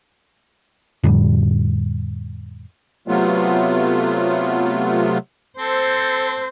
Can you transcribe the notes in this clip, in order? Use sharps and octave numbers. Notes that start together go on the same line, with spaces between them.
F2 A2 D3 G3
C3 F#3 A3 B3 F4
C4 A4 C5